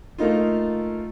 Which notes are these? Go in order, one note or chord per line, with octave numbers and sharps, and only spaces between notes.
A3 A#3 D#4 F4